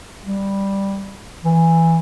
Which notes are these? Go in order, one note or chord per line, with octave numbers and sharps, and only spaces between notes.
G3
E3